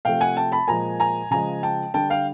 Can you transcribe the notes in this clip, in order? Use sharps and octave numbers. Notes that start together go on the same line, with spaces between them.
C3 F3 A3 F5 G5
F#5 G#5
G5 A5
A5 B5
A#2 F3 G#3 G#5 A#5
G#5 A#5
C#3 F3 G#3 G#5 A#5
G5 A5
D3 G3 G5 A5
F5 G5